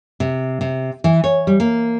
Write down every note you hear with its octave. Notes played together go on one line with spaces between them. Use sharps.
C3
C3
E3
C#5
G3
A#3